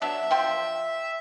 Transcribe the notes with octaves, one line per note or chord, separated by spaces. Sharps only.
F#3 B3 D4 E5
F3 G5 C6